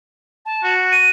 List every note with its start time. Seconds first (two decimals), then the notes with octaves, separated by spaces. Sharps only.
0.46 A5
0.64 F#4
0.92 D#7